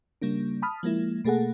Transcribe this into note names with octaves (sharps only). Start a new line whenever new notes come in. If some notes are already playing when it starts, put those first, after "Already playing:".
C#3 G3 A#3 D4
A5 B5 D#6 F6
F3 G#3 A#3 E4
B2 A3 A#3 G#4 A4 F#5